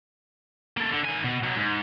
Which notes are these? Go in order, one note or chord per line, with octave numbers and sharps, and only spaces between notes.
A#3 A4
D3
D#3 G#5
B2
B2 F#3
G#2